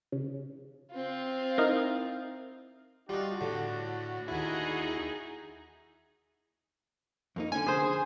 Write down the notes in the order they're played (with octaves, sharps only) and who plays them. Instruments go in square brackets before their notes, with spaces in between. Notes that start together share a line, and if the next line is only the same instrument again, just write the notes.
[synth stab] C#3
[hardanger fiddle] C4 F4
[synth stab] D#4 E4 A#4
[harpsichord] G3 D#4 [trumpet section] D4 F#4 [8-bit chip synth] F4
[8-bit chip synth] A2 [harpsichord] D3
[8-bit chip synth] D#2 E4 [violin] D#4 G#4
[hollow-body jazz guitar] F2 A#3 D#4
[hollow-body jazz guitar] D3 C#4 [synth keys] G#5
[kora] G#4 C5